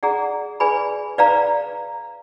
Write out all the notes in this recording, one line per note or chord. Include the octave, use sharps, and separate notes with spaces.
G#4 D5 F#5 A#5
G#4 B4 D5 G#5 B5
B4 D5 F5 A#5